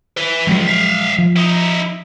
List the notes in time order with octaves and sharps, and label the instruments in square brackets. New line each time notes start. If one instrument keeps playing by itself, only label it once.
[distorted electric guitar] B4 E5
[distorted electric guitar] C#2 [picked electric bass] F3 F#3 G#3
[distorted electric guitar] E5 F5
[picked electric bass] F3
[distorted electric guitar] D#4 E4